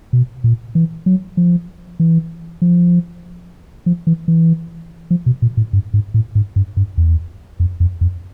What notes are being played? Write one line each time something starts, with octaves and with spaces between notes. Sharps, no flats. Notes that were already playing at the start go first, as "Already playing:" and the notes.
B2
A#2
E3
F#3
F3
E3
F3
F3
E3
E3
F3
B2
A#2
A2
G2
G#2
A2
G#2
G2
G2
E2
F2
F2
F2